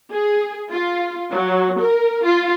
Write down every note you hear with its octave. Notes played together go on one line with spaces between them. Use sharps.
G#4
F4
F#3
A#4
F4